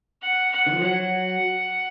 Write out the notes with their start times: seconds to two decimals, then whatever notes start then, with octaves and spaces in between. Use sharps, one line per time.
0.22 F#5
0.52 F#5
0.66 D#3
0.73 F3
0.81 F#3 F#5